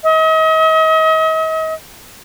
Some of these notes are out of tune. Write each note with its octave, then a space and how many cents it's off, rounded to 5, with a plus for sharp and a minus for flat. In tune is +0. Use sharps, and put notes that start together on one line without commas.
D#5 +40